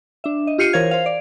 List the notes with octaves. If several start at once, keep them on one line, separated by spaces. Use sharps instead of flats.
D4 E5
D#5
F4 G4 F6 C7 C#7 D#7
E3 A#4 C5 C#5 F5 G#6
C5 F5
D5